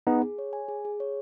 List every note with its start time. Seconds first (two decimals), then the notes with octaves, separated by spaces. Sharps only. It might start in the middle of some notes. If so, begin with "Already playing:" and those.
0.07 B3 D#4 G#4
0.22 G#4
0.38 C#5
0.53 G#5
0.68 G#4
0.85 G#4
1.00 C#5